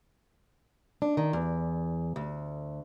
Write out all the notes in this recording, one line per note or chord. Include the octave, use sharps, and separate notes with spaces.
D4
D#3
E2
D2